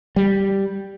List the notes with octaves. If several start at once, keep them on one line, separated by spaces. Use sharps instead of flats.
G3